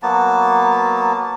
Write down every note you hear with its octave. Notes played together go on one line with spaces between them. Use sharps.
F#3 A#3 B3 A5